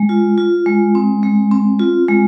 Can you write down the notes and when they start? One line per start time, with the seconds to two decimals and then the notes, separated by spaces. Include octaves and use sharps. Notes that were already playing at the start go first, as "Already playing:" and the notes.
Already playing: G#3
0.09 F4
0.38 F4
0.66 G#3
0.95 C4
1.23 G#3
1.51 C4
1.80 F4
2.08 G#3